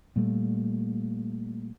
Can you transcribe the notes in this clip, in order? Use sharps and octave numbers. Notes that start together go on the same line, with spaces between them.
A#2 G3 A3